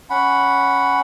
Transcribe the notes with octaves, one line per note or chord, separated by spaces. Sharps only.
C#4 F#5 B5